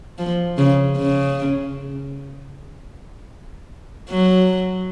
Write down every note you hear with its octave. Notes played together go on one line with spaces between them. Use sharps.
F3
C#3
C#3
F#3